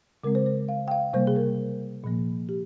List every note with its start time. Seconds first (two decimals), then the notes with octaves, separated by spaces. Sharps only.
0.24 C#3 G#3 C4 A#4
0.35 C5
0.46 C5
0.69 F5
0.88 G5
0.91 F5
1.13 C3 G3 A#3 C5
1.27 G#4
1.36 A#4
2.04 A#2 F3 A#3
2.49 G4